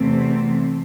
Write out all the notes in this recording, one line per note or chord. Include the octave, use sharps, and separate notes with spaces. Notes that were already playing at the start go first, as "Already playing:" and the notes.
Already playing: E2 C3 E3 A3 C4